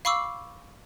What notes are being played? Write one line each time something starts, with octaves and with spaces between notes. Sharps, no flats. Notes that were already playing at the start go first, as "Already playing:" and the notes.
F5 B5 C#6 D6 E6